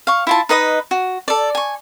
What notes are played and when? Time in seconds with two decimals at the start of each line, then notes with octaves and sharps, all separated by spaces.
0.07 F5 C#6
0.27 E4 F4 A5
0.49 D#4 B4 D#5 D#6
0.91 F#4
1.28 A4 D5
1.55 G#5 C#6